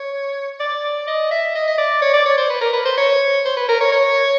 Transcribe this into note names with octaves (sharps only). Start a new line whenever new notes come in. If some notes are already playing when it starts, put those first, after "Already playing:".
Already playing: C#5
D5
D#5
E5
D#5
D#5
D5
C#5
D5
C#5
C5
B4
A#4
B4
C5
C#5
C5
B4
A#4
C#5
C#5